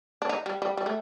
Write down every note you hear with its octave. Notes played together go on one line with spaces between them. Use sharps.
D4
D#4
G3
G3
G3
A3